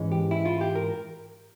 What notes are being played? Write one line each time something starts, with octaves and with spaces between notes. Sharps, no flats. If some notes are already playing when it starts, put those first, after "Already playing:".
Already playing: G#2 E3 G#3 C#4
G4
E4
F4
G4
A#4